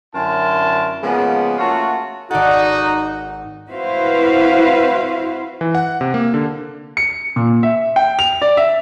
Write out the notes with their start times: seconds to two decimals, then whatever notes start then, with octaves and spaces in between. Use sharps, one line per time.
0.14 F#2 D3 E4 A#4 A5 C6
1.02 C#3 F3 G#3 A#3 B3
1.59 A3 A#3 C#4 F4 F#4
2.31 G#1 D#4 F#4 A4 D5 F#5
3.69 C4 E4 F#4 B4 C5 F5
5.61 E3
5.75 F#5
6.01 C3
6.14 A#3
6.34 D3
6.97 C#7
7.36 A#2
7.63 E5
7.96 G5
8.19 F7
8.42 D5
8.57 E5